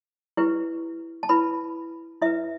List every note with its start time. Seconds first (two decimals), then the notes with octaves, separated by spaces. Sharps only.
0.37 E4 G4 B4
1.23 A5
1.29 E4 B4 B5
2.22 E4 B4 E5